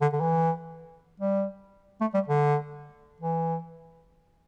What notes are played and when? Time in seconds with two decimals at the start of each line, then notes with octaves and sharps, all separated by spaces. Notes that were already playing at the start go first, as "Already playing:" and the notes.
0.01 D3
0.13 D3
0.21 E3
1.20 G3
2.01 A3
2.14 G3
2.28 D3
3.21 E3